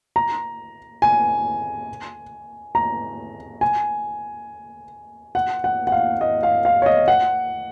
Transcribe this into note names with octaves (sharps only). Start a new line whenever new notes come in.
A#5
G#5
A#5
G#5
F#5
F#5
F#5
F5
D#5
F5
F5
C#5
D#5
F#5